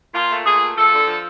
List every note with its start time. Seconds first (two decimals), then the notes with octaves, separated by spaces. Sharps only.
0.14 A#2 F4
0.30 A3
0.45 A#2 G#4
0.61 A3
0.76 F3 A4
0.92 D3
1.08 F3